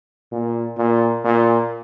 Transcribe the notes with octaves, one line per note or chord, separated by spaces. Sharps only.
A#2
A#2
A#2